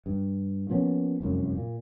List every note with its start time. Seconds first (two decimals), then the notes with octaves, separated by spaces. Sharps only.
0.06 G2
0.70 F3 A#3 B3 C#4
1.20 F1 C2 F#2
1.57 A#2